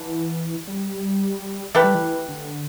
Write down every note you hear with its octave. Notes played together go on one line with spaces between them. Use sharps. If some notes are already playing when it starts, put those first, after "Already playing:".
Already playing: D3 E3
G3
E3 A3 E4 G4 B4
G3
E3
D3